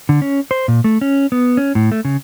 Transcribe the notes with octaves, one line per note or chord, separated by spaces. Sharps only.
D3
C#4
C5
A#2
A3
C#4
B3
C#4
A2
A3
C#3